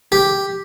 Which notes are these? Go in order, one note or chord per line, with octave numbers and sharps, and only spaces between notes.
G4